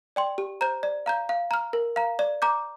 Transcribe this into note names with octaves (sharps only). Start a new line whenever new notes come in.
D5 G5 C6
G4
C5 A#5 G6
D5
F5 A#5 G6
F5
A#5 F6
A#4
F5 A#5
D5
A#5 D6 G6